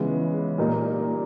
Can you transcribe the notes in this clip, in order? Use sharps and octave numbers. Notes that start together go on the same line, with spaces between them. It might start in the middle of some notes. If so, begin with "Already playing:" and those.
Already playing: C#3 E3 G#3 B3
A#2 G3 A#3 D#4